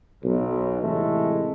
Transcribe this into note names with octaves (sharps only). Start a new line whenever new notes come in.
B1
A2 C3 E3 G#3 A3